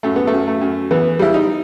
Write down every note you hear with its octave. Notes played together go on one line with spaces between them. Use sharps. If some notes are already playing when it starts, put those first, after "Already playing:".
F#2 A3
B3
A3
F#2
A3
F#2
E3 B3
G3 E4
D#4